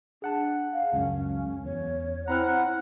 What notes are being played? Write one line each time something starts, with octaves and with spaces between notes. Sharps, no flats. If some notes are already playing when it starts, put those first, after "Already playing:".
D4 G#4 F#5 A5
F5
C#2 F#2 C#4
E2 C#5
C4 E4 F#5 A#5 B5 F6